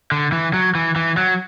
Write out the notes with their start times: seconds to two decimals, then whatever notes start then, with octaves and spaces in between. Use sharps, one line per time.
0.12 D3
0.32 E3
0.54 F#3
0.75 E3
0.96 E3
1.17 F#3